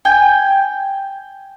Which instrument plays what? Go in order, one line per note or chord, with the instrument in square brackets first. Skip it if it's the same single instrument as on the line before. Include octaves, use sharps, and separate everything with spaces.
[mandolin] G5 G#5